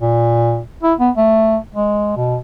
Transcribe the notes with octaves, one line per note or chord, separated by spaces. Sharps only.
A#2
E4
B3
A3
G#3
B2